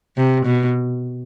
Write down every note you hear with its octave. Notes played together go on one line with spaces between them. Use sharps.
C3
B2